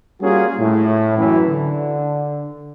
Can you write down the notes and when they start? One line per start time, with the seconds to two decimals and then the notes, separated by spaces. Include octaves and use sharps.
0.20 G3 A#3 C#4 F4 F#4 G#4
0.57 A2
1.16 F#2 E3
1.47 D3